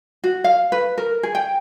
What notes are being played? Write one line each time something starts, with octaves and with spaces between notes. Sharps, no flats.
F#4
F5
B4
A#4
G#4
G5